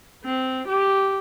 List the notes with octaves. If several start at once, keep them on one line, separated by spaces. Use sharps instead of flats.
C4
G4